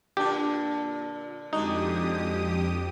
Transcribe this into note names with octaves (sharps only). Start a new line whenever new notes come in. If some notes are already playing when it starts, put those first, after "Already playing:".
A#2 D3 D4 G4
F2 D3 G#3 D#4 F#4 G4 D#6